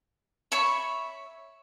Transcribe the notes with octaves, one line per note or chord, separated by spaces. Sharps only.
C#5 E5 B5 C#6